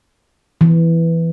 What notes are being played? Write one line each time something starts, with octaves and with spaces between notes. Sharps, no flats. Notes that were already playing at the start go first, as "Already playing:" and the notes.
E3